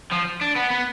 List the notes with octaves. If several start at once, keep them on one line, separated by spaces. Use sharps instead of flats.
F3
D4
B3
B3